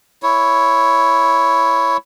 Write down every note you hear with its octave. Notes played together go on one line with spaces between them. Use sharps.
E4 C#5